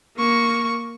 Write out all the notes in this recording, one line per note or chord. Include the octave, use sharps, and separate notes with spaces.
A#3 C#6